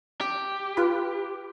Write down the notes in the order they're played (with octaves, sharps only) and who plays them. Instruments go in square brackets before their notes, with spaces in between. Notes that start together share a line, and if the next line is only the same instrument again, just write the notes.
[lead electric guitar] G4
[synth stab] F4 B4